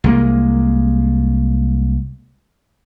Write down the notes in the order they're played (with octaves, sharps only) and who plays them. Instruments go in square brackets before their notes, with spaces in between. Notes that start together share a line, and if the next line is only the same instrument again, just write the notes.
[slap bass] C2 G#3 A#3